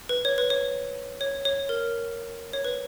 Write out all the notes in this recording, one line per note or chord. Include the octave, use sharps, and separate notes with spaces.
B4
C#5
B4
C#5
C#5
C#5
A#4
C#5
B4